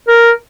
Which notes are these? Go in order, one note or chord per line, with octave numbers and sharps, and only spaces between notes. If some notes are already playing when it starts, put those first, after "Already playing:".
A#4